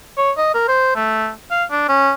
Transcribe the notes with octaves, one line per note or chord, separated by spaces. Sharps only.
C#5
D#5
A#4
C5
A3
F5
D4
C#4